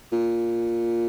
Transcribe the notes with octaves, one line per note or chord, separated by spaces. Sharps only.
A#2